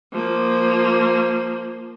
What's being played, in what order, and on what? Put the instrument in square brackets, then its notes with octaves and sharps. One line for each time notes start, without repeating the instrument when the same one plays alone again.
[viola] F3 A#3